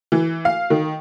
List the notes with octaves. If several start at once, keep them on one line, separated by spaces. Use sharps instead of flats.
E3
F5
D#3